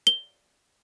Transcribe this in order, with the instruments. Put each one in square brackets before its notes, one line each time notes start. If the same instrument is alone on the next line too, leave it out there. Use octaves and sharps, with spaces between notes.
[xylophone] G7